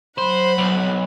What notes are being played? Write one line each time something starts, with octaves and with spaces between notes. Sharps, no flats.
F#3 C5 F#5 B5
B1